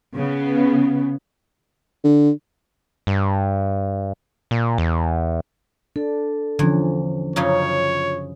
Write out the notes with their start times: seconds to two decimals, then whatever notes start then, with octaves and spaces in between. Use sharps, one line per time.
0.15 C#3 B3
2.04 D3
3.07 G2
4.51 A#2
4.78 E2
5.96 D4 A4
6.59 E2 D3 F3 C#4
7.36 F#2 C#3 D#4 F4 C#5